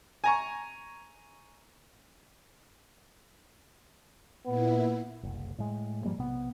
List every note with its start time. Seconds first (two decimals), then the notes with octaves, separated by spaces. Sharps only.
0.24 G#5 A#5 C#6
4.46 A#2 B3 E4
5.23 F#1 C2
5.58 A2 G#3
6.05 G#2 F3 G3 A#3
6.18 B1 C3 B3